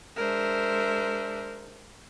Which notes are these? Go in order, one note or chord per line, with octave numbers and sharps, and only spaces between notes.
G#3 D4 A#4 C5 E5